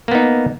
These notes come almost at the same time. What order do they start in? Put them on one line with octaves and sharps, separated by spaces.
A#3 B3 D#4